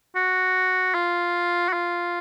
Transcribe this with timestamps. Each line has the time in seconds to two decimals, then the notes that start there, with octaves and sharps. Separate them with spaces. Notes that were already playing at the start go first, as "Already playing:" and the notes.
0.16 F#4
0.94 F4
1.69 F#4
1.73 F4